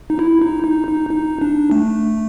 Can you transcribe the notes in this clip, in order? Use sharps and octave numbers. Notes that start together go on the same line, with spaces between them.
D#4
E4
D#4
D#4
D#4
D#4
D4
A3